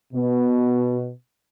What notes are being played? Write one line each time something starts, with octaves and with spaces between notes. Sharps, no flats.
B2